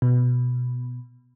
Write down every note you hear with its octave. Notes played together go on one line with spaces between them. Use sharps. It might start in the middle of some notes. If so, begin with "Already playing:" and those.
B2